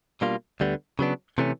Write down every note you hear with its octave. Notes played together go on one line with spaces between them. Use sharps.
B2 G3 A#3 D4 F4
D2 D3 G3 B3
C#3 F#3 B3 D4
C3 E3 A3 C#4